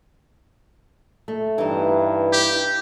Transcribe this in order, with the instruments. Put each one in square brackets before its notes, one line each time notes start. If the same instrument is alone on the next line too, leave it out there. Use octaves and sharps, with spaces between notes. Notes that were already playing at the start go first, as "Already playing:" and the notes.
[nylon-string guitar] A3
[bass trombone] G2 [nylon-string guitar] E3 D#4
[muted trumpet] G4